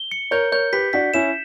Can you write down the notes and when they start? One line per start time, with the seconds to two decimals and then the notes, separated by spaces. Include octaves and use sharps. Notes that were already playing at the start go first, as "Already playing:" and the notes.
Already playing: G7
0.11 C#7
0.31 A#4 C#5 G6
0.52 A#4 C#5 G6
0.73 G4 B4 B6
0.93 D4 F#4 B6
1.14 C#4 E4 E7